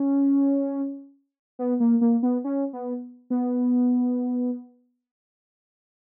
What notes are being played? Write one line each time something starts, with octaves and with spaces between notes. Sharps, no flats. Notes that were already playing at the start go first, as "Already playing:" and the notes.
Already playing: C#4
B3
A#3
A#3
B3
C#4
B3
B3